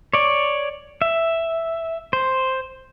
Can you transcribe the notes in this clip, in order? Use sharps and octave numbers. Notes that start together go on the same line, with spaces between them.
C#5 D5
E5
C5